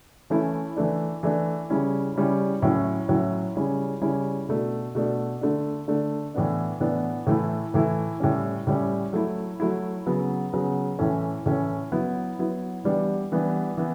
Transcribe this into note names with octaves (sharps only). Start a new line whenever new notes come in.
E3 A3 C#4 E4
E3 A3 D4
E3 A3 D4
C#3 G3 C#4 E4
C#3 G3 C#4 E4
A2 F#3 C#4 E4
A2 F#3 C#4 E4
C#3 G3 C#4 E4
C#3 G3 C#4 E4
B2 A3 D4
B2 A3 D4
D3 A3 D4
D3 A3 D4
A2 E3 B3 D4
A2 E3 B3 D4
A2 E3 A3 E4
A2 E3 A3 E4
A2 G3 C#4
A2 G3 C#4
F#3 A3 E4
F#3 A3 E4
C#3 F#3 B3
C#3 F#3 B3
A2 E3 A3 C#4
A2 E3 A3 C#4
F#3 B3 E4
F#3 B3 E4
E3 G3 B3 D4
E3 G3 B3 D4
E3 B3